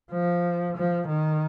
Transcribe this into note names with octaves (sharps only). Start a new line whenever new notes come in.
F3
F3
D#3